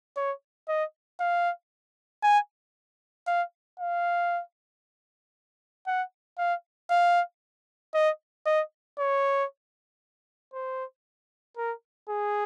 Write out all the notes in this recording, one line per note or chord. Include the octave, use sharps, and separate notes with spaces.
C#5
D#5
F5
G#5
F5
F5
F#5
F5
F5
D#5
D#5
C#5
C5
A#4
G#4